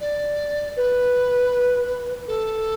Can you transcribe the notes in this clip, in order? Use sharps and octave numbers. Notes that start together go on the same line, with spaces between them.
D5
B4
A4